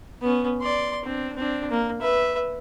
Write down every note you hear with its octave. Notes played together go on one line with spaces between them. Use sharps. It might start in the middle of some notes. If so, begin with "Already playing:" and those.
B3 C#4
D5 C6
C4 D4
C4 D4
A#3
B4 E5